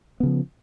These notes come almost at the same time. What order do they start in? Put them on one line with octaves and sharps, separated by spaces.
B3 C#3 F3